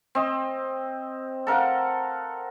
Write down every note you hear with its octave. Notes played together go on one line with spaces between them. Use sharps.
C4 D#5
A4 A#4 F5 F#5